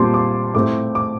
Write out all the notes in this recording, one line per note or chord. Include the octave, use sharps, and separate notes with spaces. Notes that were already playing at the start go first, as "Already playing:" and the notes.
Already playing: A#2 G3 C4 A5 C6 D6
D6
A2 A3 C4 D6
D6